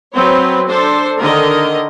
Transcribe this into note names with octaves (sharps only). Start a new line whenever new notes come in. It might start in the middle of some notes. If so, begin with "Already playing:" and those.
F#3 C4 B4 C#5
D4 A4 C5
D3 D#3 A#4 D#5